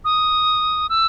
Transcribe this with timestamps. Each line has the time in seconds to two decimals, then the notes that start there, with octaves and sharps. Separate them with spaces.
0.05 D#6
0.89 E6